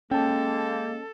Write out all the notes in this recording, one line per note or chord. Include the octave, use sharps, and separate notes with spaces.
G#3 A#3 C#4 A4 G5 A5